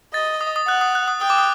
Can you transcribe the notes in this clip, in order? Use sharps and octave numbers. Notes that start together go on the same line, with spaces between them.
D#5 A6
D#6
D#6
F#5 F#6
D#6
F#6
D#6
G5 D#6
D6
D#6